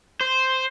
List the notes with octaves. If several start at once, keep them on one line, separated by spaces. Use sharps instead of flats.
C5